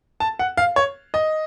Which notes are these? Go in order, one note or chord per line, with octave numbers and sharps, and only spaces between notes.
A5
F#5
F5
C#5
D#5